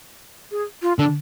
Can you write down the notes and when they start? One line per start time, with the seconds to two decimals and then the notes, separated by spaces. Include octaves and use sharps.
0.51 G#4
0.82 F4
0.98 D3 D4